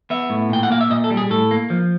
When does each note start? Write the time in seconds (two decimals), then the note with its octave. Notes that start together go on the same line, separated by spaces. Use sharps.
0.10 B3 E5
0.30 A2
0.50 A#2 G5
0.63 F#5
0.70 A#3 F5
0.81 E5
0.90 A#2 D#5
1.04 A4
1.10 G3
1.17 G#4
1.30 A2 A4
1.51 A#3
1.70 F3